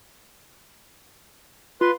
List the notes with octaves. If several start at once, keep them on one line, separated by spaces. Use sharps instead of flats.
F4 B4 C6